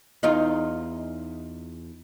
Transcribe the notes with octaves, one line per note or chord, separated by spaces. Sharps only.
E2 D#4 F4